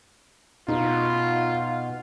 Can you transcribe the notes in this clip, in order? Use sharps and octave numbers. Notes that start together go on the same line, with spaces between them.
B2 D#4 F4